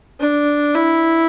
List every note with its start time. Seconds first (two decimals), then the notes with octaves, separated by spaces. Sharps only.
0.20 D4
0.74 E4